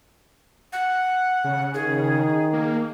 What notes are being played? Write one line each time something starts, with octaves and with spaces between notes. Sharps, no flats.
F#5
C#3
D#3 G#4
A#3